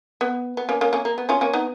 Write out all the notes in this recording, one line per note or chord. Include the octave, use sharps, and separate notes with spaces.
B3
B3
A#3 C#4
A#3 C#4
A#3 C#4
A#3
B3
C#4 F4
A#3 C#4
B3 D#4